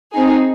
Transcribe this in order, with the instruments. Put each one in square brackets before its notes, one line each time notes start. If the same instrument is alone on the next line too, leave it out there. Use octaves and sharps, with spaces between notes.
[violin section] C4 D#4 G#4